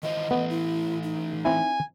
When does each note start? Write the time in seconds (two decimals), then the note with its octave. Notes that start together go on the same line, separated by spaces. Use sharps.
0.03 D#3 E3 C5 D#5
0.31 E3 A3 B3
0.50 E4
1.03 D#4
1.45 C4 E4 G#5